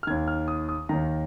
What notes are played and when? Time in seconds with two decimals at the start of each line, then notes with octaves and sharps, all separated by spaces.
0.03 F6
0.07 D#2 D#3 G#6
0.28 F6
0.48 D#6
0.69 D#6
0.89 D#2 D#3 A#5